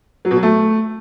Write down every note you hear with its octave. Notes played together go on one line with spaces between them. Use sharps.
F#3
B2
F#3
A3